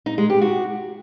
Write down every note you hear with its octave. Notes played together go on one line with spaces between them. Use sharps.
D#4
G#3
G4
F#4